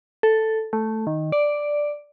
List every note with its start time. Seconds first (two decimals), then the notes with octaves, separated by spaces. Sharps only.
0.23 A4
0.73 A3
1.07 D#3
1.32 D5